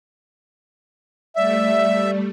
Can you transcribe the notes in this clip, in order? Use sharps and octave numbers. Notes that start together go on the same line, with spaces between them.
G3 A3 D5 E5